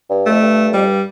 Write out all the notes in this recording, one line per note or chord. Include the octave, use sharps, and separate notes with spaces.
G2
A3
F2
G2
F2 G3
G2